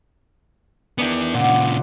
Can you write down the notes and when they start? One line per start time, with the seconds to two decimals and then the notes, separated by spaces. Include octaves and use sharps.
0.98 D#3 B3 D4 E4 G#5
1.34 A#2 C#3 F4 D5 F#5